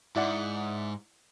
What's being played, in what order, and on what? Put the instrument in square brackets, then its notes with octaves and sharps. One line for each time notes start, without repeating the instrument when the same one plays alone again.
[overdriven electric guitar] G#2 [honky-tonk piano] E4 D5 F#5